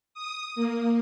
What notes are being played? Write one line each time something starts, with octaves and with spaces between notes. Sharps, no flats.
D#6
A#3